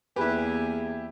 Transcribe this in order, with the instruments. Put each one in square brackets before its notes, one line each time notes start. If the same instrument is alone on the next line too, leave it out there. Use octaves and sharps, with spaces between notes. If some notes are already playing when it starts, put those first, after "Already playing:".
[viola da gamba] E2 A#3 [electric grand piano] E4 G4 [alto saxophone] G#4 [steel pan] B4